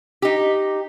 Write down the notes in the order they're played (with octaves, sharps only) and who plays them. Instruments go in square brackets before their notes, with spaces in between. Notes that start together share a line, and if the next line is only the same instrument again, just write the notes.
[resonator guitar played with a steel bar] D#4 G4